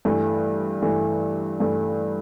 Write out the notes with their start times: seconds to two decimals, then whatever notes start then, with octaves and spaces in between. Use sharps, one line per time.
0.05 G2 E3 A3
0.82 G2 E3 A3
1.60 G2 E3 A3